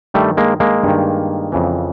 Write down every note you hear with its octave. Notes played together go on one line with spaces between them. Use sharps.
G2 D#3 G3 A3
G#3 A#3
G#3 A#3
G2 D#3
F2 C#3 E3